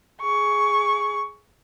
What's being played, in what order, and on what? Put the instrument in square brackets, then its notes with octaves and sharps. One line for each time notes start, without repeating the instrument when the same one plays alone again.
[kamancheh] G#4 C#6